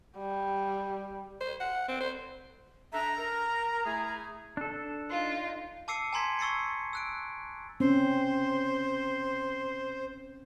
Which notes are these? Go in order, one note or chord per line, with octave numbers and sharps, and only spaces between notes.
G3
C5
F#5
C4
C5
D4 A4 E5 A#5
A#4
A3 E4 G#4
D4 A4
D#4 F4
A5 D6 E6 C7 C#7 D#7
G#5 A#5 C6 G#6 B6
C#6 E6 A6 C7 C#7
E6 F#6 D7
C4 C#4 C5